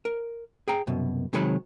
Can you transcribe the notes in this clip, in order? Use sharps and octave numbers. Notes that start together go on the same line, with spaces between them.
A#4
G#4 G5 A#5
C2 F#2 B2
C3 D#3 F#3 G#3 C#5 B5